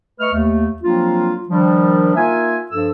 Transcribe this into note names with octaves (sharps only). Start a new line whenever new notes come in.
A3 B4 D#5 C#6 F6
D#2 A3
F3 F#3 A#3 C4 D4 F4
D#3 F3 G3 D4
A#3 D#4 F4 A#4 E5 G#5
G2 F3 A4 E6